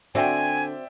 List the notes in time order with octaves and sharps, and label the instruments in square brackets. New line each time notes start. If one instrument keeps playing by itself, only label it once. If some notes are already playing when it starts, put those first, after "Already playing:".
[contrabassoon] D3 [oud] C4 F#4 [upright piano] D5 E5 G5 [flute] G#5